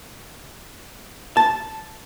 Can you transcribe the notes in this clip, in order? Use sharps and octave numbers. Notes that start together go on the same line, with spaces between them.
A5